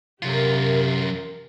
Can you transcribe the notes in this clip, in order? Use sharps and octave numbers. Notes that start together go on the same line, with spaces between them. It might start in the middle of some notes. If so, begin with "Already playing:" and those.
F#2 C3 F4 G4 A#4